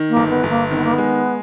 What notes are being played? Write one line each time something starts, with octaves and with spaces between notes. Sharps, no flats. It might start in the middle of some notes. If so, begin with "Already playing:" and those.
Already playing: D#3
A#3
G1
B3
G1
A#3
D#3 C4
B3
A#3
B3
G#3